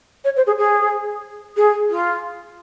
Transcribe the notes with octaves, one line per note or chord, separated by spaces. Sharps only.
C#5
C5
G#4
G#4
G#4
F4